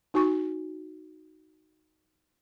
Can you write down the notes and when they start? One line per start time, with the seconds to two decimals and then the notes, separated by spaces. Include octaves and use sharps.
0.14 D#4 F#4 G#5 C#6